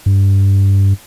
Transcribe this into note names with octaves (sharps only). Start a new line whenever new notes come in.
G2